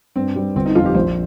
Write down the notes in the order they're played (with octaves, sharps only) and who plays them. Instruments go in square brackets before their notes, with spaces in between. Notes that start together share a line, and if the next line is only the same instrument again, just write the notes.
[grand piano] G2 [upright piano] C4
[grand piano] G3 C4
[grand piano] G1 [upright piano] C4
[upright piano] D#4
[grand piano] F2 F3 C4 [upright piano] F4
[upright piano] G4
[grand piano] A#1 [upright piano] C5